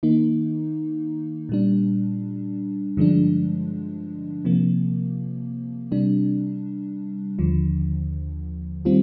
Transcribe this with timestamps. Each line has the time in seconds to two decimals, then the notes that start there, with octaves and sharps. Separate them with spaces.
0.03 D#3 A#3 D#4
1.49 A#2 G3 D4
2.97 G2 D3 F3 G#3 D4
4.45 C3 F3 A#3
5.92 C3 G3 D4
7.39 D#2 D3 F3
8.85 D#3 G3 C4 F4